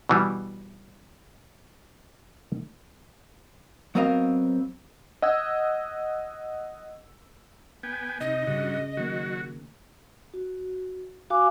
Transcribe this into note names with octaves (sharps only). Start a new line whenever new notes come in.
B2 E3 G3
F#3 B3 C4 A#4 D#5 F5
D#5 F#5 E6 G#6
B3 G5 G#5
C3 D#4 D#5
G2 C#3 F#4
D#3 F#3 A#3 F#4
F#4
F#4 F5 G#5 D6